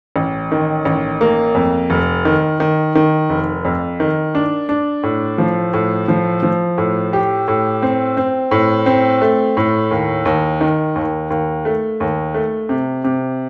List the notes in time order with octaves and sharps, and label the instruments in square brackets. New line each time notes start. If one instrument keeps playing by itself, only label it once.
[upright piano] A1
D#3
A1
A#3
F2
F1
D#3
D#3
D#3
F1
F2
D#3
D4
D4
A2
F3
A2
F3
F3
A2
G4
A2
C4
C4
A2
C4
A3
A2
D#2
D#2
D#3
D#2
D#2
A3
D#2
A3
C3
C3